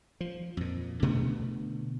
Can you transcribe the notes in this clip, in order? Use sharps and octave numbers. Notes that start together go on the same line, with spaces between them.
F3
F2 A#2
B2 D3 A3 B3